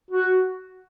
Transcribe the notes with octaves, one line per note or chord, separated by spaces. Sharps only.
F#4